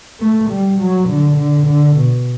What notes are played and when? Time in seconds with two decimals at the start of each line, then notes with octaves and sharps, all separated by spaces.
0.20 A3
0.50 G3
0.79 F#3
1.08 D3
1.38 D3
1.67 D3
1.96 B2